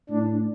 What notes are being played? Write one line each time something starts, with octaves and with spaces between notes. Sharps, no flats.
A2 D4